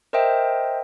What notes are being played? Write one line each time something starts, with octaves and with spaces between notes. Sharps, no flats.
A#4 C5 D#5 E5 G5